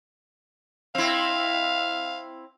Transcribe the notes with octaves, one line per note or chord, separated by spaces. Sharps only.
C4 E4 F5